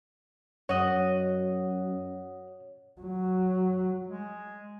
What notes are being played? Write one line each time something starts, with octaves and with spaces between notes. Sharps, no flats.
F#2 F#4 C#5 D#5
F#3
G#3